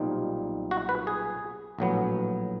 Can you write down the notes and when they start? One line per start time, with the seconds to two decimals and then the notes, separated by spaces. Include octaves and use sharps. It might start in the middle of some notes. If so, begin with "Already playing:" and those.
Already playing: B1 A#2 G3 C4 D#4
0.71 F#4
0.89 B4
1.07 G#4
1.79 A#1 A2 F#3 B3